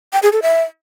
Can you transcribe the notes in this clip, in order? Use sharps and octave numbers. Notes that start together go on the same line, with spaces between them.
G5
G#4
A4
E5